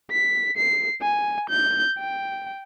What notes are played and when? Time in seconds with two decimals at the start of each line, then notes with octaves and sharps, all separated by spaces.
0.11 B6
0.57 C7
1.02 G#5
1.50 G6
1.99 G5